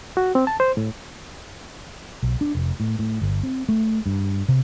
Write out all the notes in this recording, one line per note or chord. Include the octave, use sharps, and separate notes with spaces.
F#4
C4
A5
C5
A2
B1
D4
F1
A2
A2
G1
C4
A3
G2
C3